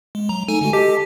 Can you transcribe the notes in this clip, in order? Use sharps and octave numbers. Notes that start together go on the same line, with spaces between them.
G#3
F#3 A#5
A3 D#4 A4 G#5
D3 G#3 F#4 G#5
G4 A4 D#5 A5